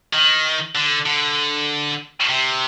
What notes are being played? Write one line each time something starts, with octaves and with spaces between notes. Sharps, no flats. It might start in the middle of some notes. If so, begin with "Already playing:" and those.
D#3
D3
D3
C3